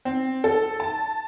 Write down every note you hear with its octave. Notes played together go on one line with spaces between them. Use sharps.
C4
A4
A5